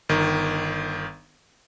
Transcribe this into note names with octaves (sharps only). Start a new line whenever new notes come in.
G1 D#3